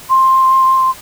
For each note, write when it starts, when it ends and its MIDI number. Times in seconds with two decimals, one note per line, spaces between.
0.10 0.91 84